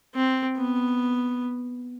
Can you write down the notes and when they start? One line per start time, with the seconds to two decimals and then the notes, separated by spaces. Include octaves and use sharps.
0.15 C4
0.57 B3